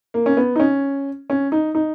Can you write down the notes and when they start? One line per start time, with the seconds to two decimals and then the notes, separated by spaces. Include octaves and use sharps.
0.14 A#3
0.26 C#4
0.37 B3
0.56 D#4
0.60 C#4
1.30 C#4
1.52 D#4
1.75 D#4